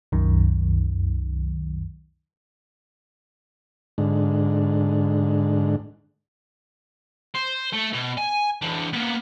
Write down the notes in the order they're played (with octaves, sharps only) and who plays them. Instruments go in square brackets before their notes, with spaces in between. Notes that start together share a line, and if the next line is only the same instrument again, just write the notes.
[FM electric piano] C2 F#2 D#3
[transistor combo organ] G#2 D3
[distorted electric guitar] C5
A3
B2
G#5
E3 D4
A#3 B3